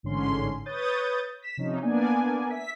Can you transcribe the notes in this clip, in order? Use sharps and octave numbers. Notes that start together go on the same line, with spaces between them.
A1 G#2 D3 C#4 C6
B4 C#5 D#6 G6 A6
B6 E7
C3 F3 C#4 D#4
A#3 B3 D4 D5 G#5
E5 B6